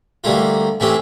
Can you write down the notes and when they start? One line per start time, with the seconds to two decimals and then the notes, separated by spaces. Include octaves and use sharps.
0.24 D2 G3 A3 A#3 F4
0.80 A2 E3 C4 C#4 G4